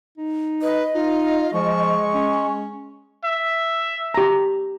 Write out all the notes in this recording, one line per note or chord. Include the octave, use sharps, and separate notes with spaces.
D#4
B4 D#5
D#4 F4
F3 G#3 C#6
C#4
E5
G4 A#5